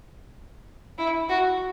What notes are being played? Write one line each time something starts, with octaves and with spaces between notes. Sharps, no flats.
E4
F#4